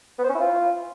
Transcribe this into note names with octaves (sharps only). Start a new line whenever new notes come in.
B3
C5
C#4
E4
F4